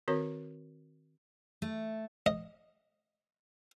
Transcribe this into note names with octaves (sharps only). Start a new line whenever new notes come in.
D#3 C4 F#4 A#4 C#5
A3
D#5